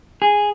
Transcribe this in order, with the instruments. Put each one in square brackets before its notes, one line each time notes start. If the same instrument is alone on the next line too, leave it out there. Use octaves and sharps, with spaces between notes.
[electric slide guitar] G#4